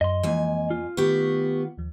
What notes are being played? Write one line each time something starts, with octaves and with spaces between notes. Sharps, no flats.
F#2 D#5 C6
F2 E3 F3 G#3 A#3 C4 G#5
F4
D#3 A3 B3 G4 C#6
D#2 F3